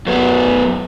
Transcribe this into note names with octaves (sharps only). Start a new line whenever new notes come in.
F#2 B3